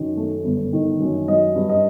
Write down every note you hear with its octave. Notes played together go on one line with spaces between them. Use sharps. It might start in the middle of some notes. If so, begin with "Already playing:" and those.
Already playing: F#2 D#3
A3
G1
D#3
F#2
F#3 D#5
G2
D#5